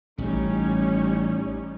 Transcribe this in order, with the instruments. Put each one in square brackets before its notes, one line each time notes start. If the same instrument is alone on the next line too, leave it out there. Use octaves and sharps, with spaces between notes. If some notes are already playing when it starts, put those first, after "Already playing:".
[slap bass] A1 [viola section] G3 C#4 D#4